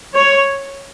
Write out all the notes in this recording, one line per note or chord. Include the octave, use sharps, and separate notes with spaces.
C#5